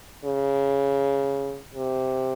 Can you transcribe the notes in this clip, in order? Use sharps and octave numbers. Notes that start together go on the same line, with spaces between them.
C#3
C3